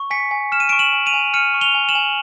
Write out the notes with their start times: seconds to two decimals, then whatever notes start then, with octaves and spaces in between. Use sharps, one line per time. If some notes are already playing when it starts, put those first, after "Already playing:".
Already playing: C#6
0.10 G#5 B6 C#7
0.31 G#5
0.52 F6 E7
0.60 D#7
0.69 D7 E7
0.72 C#6
0.79 E7 F#7
0.93 G#5
1.06 D#7 F7
1.13 G#5
1.34 F6 C#7 D#7
1.54 C#6
1.61 F7 G7
1.75 G#5
1.89 E7 F#7
1.95 G#5